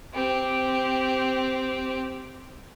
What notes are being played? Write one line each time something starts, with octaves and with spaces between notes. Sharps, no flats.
C4 G4